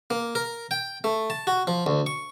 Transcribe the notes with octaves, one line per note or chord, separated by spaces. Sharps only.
A#3
A#4
G5
A3
A5
F#4
F3
D2
C#6